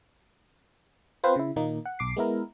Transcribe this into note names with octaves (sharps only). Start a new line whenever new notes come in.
C4 F4 B4 C5
C#3 E4
A#2 D#3 A#3 D#4
F#5
B1 D6 C7
G#3 B3 E4 A#4